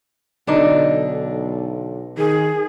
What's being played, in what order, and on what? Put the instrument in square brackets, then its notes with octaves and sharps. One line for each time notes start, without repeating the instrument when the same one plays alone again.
[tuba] B1 [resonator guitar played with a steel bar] D3 D4 D#4
[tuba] D#3 [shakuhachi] G#4